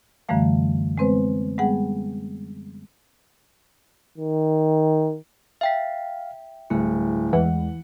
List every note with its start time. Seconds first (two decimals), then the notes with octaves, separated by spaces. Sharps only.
0.29 F#2 D3 E3 G3 A3 F5
0.98 G#3 B3 C4 B4 C5
1.58 G3 G#3 B3 G#4 F#5
4.18 D#3
5.61 E5 F5 G5 B6
6.70 D1 G3 A3 E4
7.33 E2 E3 G#3 F#5